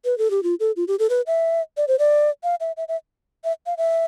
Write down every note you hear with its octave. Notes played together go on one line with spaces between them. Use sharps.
B4
A4
G4
F4
A4
F4
G4
A4
B4
E5
D5
C5
D5
F5
E5
E5
E5
E5
F5
E5